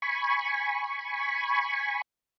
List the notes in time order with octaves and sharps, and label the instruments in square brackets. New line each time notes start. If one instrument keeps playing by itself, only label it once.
[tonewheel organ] G#5 B5 C#6